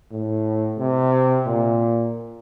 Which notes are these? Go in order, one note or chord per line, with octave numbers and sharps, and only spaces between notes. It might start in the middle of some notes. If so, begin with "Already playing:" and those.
A2
C3
A#2